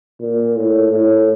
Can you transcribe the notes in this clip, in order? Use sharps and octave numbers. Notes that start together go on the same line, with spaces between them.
A#2
A2
A2